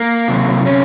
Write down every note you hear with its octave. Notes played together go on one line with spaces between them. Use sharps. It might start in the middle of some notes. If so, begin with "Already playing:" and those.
Already playing: A#3
C3 F#3
C#4